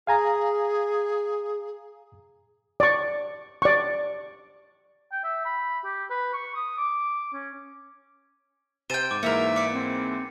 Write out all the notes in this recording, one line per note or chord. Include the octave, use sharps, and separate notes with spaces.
G#4 F5 G#5 A#5
D5 C#6
D5 C#6
G5
E5
B5
G4
B4
C#6
D#6
D6
C#4
C3 C5 G5 G#5 A6 D#7
G#2 D6
G#2 E3 A#3 F#4 A4 A#4 E5
D5 D6 C#7
C4